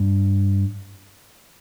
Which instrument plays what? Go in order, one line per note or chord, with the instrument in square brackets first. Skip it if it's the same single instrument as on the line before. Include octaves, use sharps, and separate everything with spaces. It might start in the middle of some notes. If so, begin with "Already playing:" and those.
Already playing: [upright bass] G2